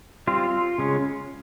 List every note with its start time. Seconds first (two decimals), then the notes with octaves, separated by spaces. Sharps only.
0.27 G3 C4 F4
0.78 C#3 G#3 C#4